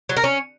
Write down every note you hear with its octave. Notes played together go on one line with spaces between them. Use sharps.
F#3
A#4
C#4